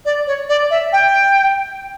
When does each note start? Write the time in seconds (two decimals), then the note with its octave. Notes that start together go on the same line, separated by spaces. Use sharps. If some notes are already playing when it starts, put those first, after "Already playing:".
0.05 D5
0.27 C#5
0.49 D5
0.71 E5
0.93 G5